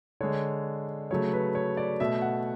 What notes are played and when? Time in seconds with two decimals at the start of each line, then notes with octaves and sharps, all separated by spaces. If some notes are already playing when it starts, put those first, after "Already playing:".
0.21 D3 G#3 C#5
1.10 C#3 F#3 A3 C#5
1.33 B4
1.55 C#5
1.77 D5
2.00 B2 A3 E5
2.22 F#5